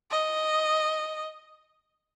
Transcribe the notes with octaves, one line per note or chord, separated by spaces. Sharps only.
D#5